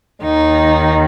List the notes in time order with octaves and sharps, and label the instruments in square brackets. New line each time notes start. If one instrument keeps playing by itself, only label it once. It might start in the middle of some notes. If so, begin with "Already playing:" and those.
[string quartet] D#2 D#3 D#4